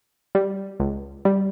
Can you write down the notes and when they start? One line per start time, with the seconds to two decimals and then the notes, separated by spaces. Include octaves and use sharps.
0.35 G3
0.80 C#2
1.25 G3